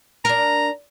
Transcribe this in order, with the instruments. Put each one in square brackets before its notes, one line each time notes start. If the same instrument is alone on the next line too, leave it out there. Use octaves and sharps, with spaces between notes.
[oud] D4 A#4 [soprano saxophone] A#5